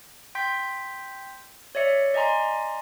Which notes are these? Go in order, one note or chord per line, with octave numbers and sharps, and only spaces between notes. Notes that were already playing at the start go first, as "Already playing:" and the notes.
G5 C6 G6 B6
C#5 D5 E5 C#7
D5 D#5 G#5 A#5 C6